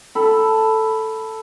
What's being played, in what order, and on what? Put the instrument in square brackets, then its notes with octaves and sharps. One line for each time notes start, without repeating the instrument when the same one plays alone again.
[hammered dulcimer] A4 B5